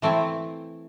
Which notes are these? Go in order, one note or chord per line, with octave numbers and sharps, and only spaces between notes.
E3 A3 C4 E4